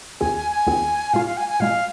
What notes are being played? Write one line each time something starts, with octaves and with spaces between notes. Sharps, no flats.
D#2 D#3 C4 F4 G#4 G#5
G#5
G#5
D#2 D#3 C4 F4 G#4
A#2 G#3 F4 F5
F5
G#5
G#5
A#2 G#3 F4 F5